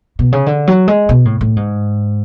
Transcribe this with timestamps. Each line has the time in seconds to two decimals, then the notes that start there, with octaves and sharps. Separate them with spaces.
0.19 B2
0.32 C#3
0.46 D3
0.67 F#3
0.88 G#3
1.09 B2
1.25 A2
1.41 A2
1.56 G#2